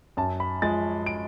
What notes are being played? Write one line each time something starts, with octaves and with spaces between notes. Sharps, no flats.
F#2 A5
B5
F3 G#3 A6
D7